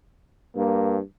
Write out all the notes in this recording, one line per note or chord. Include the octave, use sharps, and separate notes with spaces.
G2 A#3